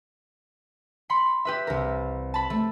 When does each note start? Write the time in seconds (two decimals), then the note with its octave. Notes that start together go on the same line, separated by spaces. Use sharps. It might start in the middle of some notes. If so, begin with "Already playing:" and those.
1.10 B5 C6 C#7
1.45 G4 B4 E5
1.67 C2 A#4
2.34 A5 B5
2.50 A3